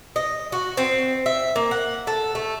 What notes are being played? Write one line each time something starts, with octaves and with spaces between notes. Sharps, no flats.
D#5
F#4
C4
E5
A#3
F#5
A4
A3